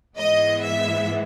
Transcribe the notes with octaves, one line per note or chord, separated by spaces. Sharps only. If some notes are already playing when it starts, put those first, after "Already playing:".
G#2 E3 G#3 B3 D#5
E5